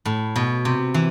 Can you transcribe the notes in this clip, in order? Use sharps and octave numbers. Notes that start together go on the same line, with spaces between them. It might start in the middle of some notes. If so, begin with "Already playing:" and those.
A2
B2
C3
E3